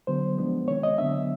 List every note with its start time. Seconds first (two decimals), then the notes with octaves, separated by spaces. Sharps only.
0.07 D3 F#3 B3 C5
0.38 F3 G#3 B3 D4
0.68 C3 D#3 G#3 C4 C#5
0.83 D#5
0.98 D3 F#3 B3 D4 E5